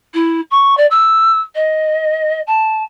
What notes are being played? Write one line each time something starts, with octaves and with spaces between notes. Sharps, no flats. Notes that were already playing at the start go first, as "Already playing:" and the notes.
E4
C#6
D5
E6
D#5
A5